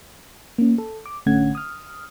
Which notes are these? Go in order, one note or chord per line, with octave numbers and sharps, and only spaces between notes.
A#3 C#4
A4
D6
A1 D3 A3 C#4 F#5 G#6
D#6 F6